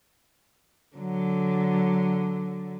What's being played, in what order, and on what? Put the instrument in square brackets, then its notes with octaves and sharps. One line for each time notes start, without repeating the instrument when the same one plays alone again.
[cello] D3 F#3